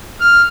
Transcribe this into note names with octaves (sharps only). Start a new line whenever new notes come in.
F6